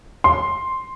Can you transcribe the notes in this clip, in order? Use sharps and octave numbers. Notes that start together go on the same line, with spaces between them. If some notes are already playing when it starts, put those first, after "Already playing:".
C6